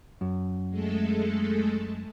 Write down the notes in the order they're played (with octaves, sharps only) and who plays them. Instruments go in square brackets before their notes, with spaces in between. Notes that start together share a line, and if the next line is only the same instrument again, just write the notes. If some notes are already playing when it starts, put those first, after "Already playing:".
[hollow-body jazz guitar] F#2
[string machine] G#3 A3 A4